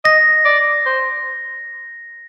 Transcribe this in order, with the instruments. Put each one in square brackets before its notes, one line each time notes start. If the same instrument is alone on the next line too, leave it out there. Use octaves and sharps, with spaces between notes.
[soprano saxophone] D#5 [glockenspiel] A#6
[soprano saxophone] D5
C5